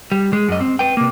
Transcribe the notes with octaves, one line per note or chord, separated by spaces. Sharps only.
G3
G#3
F#2 D#5
C4
B4 G5
C3 A#3